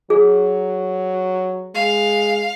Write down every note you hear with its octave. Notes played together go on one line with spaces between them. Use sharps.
F#3 G#4
G#3 F5